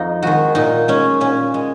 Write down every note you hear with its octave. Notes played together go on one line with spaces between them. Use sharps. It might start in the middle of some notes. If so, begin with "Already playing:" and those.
Already playing: F2 D#4 F4
D#3 G#3 F#4
A#2 D#4
G#3 C#4
A#2 C#4
G#3